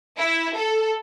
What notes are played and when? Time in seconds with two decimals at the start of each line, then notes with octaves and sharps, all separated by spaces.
0.18 E4
0.57 A4